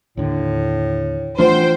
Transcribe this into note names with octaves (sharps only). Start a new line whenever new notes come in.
D#2 A2 D3
E3 A3 D4 F4 C5 F#5 G5